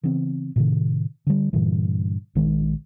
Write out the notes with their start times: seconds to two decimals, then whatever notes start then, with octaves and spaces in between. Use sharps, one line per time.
0.03 C#3 E3 B3 C4
0.56 A2 C3 D#3
1.27 D3 G3
1.53 G2 A#2 D3 E3
2.35 A#1 D#3 G#3